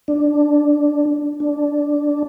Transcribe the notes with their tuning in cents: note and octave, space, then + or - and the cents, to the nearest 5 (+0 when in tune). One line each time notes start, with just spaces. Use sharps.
D4 +0
D4 -10